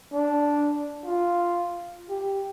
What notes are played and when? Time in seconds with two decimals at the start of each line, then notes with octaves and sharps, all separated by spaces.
0.13 D4
1.06 F4
2.10 G4